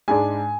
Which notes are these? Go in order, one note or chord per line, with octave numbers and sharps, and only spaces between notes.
G#2 G#3 D4 G#5